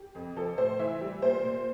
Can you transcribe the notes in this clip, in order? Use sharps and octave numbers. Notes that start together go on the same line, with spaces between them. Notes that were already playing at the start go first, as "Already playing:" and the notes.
Already playing: G4
F2
F3 A4
A2 C5
E3 E5
G3
A#2 C5
A#2